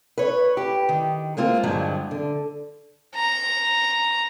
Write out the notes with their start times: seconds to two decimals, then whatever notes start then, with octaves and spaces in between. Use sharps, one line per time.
0.18 B4 C#5
0.57 G4
0.89 D#3
1.37 G#3 A#3 C4 F4
1.63 G2 A#2 D3 F3 F#3 G#3
2.11 D3
3.15 A#5